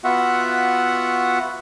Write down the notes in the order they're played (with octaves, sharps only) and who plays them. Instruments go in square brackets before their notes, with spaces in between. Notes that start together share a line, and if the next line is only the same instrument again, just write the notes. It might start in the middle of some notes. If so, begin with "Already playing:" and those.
[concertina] B3 F4 F#4 E5 F#5